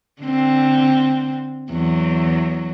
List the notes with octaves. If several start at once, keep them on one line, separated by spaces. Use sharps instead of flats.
D3 C4
E2 F#3